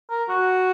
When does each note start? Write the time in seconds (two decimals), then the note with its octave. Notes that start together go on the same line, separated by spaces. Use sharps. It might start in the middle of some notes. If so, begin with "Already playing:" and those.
0.10 A#4
0.29 F#4